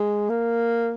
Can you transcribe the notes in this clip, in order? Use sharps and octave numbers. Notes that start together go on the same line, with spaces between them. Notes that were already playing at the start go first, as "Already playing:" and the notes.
Already playing: G#3
A#3